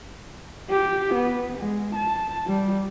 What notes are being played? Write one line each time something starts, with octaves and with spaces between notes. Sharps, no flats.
G4
B3
G#3
A5
G3